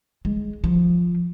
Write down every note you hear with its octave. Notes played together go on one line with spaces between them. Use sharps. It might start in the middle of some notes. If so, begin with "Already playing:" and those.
G#3
F3